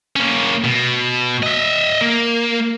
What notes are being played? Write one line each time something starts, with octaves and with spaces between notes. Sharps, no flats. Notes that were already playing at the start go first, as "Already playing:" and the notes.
A#3 C#4
B2
D#5 E5
A#3